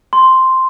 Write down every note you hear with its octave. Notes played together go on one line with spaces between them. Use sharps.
C6